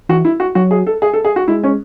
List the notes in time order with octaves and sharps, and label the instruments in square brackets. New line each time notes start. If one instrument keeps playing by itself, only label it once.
[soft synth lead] E3 [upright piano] F#4
[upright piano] E4
F#4
[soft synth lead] F#3 [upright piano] F#4
[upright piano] G#4
A4
G#4
A4
G#4
F#4
[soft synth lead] G#3 [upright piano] E4
[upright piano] C#4